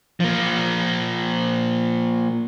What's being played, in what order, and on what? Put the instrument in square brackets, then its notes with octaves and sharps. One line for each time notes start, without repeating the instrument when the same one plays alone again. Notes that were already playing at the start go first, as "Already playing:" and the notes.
[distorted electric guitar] F3 A#3